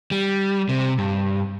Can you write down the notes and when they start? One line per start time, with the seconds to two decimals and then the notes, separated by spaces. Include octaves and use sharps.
0.11 G3
0.69 C3
0.98 G2